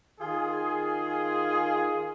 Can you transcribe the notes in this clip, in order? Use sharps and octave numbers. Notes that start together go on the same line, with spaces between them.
D#3 F4 G#4